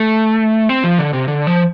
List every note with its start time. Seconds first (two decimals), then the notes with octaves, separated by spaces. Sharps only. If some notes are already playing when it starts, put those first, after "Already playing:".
Already playing: A3
0.69 C4
0.84 F3
0.98 D3
1.13 C3
1.28 D3
1.47 F3